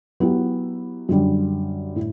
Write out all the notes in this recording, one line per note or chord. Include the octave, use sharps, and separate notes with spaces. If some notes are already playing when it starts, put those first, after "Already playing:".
F#3 B3 E4 G4
F#2 D3 G3
A2